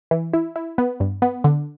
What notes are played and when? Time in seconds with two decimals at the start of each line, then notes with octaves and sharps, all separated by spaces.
0.11 E3
0.33 E4
0.56 E4
0.78 B3
1.00 G2
1.22 B3
1.44 D3